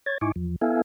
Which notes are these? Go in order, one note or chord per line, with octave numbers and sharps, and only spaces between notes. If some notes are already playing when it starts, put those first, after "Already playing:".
C#5 G#6 A6
G#2 D#4 E4 G#5 C#6 D6
E2 F3
B3 E4 A4 E5 F5 G#5